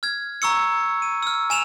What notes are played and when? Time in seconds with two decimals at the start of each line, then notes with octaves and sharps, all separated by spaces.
0.03 F6 G#6
0.42 A#5 C#6 E6 C#7
1.02 D#7
1.23 E6 F6
1.50 G#5 E7 F7